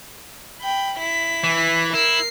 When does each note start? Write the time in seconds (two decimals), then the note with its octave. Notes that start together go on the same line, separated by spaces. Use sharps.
0.61 G5 B5
0.98 E4 B6
1.44 E3
1.93 E4 A#4 C7